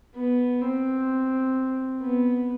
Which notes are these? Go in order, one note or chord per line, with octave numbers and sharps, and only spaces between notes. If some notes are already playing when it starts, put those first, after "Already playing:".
B3
C4
B3